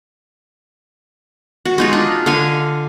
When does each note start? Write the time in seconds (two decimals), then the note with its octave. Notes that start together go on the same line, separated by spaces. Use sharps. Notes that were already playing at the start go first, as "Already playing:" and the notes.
1.65 F#4
1.78 G#3 D#4 F4
1.93 D4
2.26 D3 D#5 F5 G#5